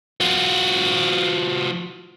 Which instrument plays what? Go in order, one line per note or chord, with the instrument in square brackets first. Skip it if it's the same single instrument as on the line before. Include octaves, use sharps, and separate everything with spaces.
[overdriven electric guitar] F3 F#4